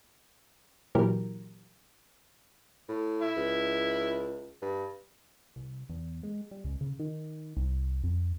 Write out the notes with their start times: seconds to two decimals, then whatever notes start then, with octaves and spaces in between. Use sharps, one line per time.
0.95 A#2 E3 F#3 E4 G4 A#4
2.88 A2
3.22 E4
3.37 C#2
4.62 G2
5.56 C2
5.89 E2
6.23 G#3
6.51 G3
6.64 C#2
6.81 C#3
6.99 D#3
7.57 C2
8.04 F2